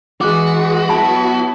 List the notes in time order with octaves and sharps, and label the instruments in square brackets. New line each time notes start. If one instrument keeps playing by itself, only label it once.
[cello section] E3 [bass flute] G#3 [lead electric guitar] F#4 [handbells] D6 F#6
[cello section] F#3 B3 E4 [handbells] A5 B5